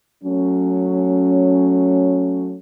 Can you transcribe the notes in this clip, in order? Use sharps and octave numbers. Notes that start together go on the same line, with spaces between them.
F#3 A3 C#4